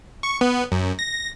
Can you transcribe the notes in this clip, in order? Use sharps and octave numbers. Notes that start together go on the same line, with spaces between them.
C#6
B3
F#2
A#6